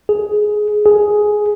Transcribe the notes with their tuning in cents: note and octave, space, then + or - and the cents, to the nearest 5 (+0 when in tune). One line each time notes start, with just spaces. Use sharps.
G#4 +15
G#4 +10